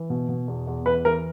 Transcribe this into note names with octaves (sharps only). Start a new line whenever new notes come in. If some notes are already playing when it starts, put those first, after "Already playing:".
Already playing: E3
B2
B2
E2
E2
E3 B4
E3 A#4